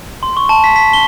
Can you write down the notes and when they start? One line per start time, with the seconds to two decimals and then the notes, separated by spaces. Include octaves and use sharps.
0.23 C6
0.37 C#6
0.49 A5
0.64 B6
0.76 B6
0.93 G7